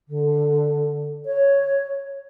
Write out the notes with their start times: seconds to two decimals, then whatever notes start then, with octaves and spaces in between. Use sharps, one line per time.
0.08 D3
1.25 C#5